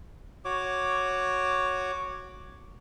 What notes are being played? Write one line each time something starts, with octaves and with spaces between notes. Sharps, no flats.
F#4 C#5 D6